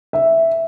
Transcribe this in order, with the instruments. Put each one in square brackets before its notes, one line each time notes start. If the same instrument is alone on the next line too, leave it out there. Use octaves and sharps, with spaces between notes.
[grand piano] E5